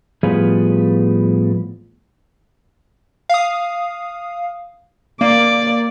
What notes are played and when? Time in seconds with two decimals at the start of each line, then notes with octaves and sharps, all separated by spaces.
0.23 A2 F3 G3 B3 F4 G#4
3.29 F5 D#6
5.21 A#3 D5